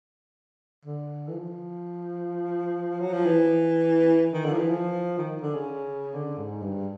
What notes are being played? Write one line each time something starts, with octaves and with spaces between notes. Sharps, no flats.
D3
E3
F3
F#3
F3
E3
D#3
D3
F3
E3
F3
D#3
D3
C#3
D3
G#2
G2